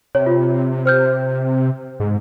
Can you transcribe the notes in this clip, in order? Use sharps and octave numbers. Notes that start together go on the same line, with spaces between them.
C3 C#5
F4
C5 F6 G6
G#2